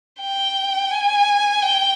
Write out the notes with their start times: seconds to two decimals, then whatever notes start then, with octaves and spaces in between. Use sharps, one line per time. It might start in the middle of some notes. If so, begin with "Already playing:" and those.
0.20 G5
0.91 G#5
1.62 G5